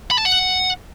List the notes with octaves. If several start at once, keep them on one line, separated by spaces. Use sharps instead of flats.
B5
A5
F#5